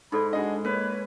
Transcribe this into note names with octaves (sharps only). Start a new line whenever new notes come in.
G#2 D#4 A4 D5 B5
D4 F#4 G#4 D#5
A#3 B4 C#5